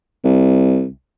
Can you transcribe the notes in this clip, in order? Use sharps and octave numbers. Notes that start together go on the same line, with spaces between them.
C2